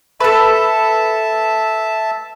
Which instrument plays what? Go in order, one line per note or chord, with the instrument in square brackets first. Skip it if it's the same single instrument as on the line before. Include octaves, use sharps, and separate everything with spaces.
[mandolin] A4 B4 [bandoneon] E5 A5